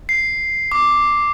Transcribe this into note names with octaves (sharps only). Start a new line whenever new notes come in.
C7
D6